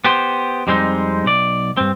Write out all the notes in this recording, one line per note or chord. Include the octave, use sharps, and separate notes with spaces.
B3 G4 C5
F2 G3 G#3 C4 D#4
B1 D5
G2 C4